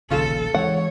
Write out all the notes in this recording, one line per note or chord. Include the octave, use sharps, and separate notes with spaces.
E1 A#1 D#2 C#3 F4 A4
E3 G#3 C#5 F#5